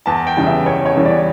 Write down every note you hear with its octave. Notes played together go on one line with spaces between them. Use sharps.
E2 A5
G5
C#3 E3 G3 B3
E5
E2 C#5
C#5
C#3 E3 G3 B3
D5